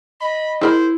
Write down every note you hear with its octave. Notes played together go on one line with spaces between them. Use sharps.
D#5 B5
E4 G#4 A#4 C5 B5